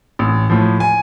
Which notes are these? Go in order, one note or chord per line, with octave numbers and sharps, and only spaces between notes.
A1
A2 F3
G#5